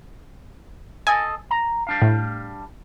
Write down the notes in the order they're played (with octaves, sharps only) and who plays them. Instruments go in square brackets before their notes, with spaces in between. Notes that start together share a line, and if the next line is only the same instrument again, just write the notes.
[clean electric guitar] A4 D#5 [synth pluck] G#5
[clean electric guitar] A#5
G3 D4 F5
[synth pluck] A2